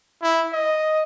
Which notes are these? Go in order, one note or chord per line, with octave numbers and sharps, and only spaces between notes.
E4
D#5